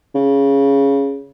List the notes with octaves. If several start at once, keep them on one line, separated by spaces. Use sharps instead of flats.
C#3